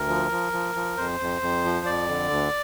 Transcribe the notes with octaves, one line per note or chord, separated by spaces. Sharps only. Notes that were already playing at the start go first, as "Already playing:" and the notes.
Already playing: D2 A#4
F3
F3
F3
F3
F2 C5
F2
F2
F3
F2 D5
D3
D2